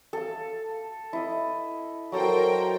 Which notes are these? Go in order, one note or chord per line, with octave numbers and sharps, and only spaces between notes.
A4 F5
E4 D#5 D#6
F#3 A4 A#4 C5 G5 C6